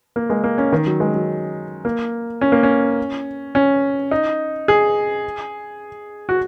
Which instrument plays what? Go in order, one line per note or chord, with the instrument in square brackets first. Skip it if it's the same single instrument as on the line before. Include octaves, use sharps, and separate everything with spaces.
[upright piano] A#3
G#3
A#3
C#4
D#3
F#3
G#3
F#3
A#3
C#4
A#3
C#4
C#4
D#4
G#4
F#4